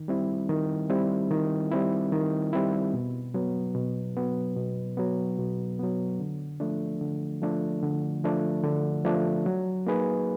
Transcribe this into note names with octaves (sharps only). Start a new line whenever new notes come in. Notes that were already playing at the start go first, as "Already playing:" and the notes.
Already playing: D#3
G3 C4 E4
D#3
G3 C4 E4
D#3
G3 C4 E4
D#3
G3 C4 E4
B2
F#3 B3
B2
F#3 B3
B2
F#3 B3
B2
F#3 B3
D3
F3 A3 D4
D3
F3 A3 D4
D3
F3 A3 D4
D3
F3 A3 D4
F#3
A#3 D#4 G#4 B4